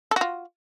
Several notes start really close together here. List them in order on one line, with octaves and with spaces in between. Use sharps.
A4 F#4 F4